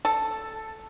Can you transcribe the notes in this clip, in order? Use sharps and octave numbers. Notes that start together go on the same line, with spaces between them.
A4